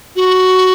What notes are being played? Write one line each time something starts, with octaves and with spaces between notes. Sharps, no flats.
F#4